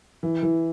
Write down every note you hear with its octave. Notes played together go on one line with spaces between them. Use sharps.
E3
E3